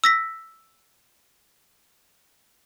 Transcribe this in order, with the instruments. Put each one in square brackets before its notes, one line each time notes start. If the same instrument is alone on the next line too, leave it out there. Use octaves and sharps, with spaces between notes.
[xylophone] E6 A#6 B6